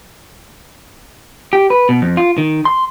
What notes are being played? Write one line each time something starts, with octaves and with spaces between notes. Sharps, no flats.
G4
B4
B2
F2
F4
D#3
C6